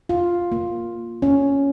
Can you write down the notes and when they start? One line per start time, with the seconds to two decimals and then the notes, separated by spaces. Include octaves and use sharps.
0.09 F4
0.52 A#3
1.22 C#4